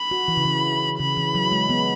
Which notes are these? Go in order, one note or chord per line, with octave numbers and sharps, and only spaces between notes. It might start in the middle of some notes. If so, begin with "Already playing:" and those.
Already playing: B5
F#4
E3
C#3
E3
C#3 B5
E3
F#3
G#3
B3